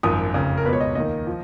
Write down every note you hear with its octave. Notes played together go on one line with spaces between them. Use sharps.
G#1 F#2 F3 D#6
F1 F2 C#3
A#4
C#2 B2 B4 C#5
D#5
D#2 D#3 D#5
F3